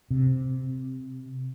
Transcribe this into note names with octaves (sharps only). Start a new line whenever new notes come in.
C3